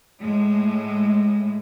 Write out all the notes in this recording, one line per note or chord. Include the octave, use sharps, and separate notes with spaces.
A2 G#3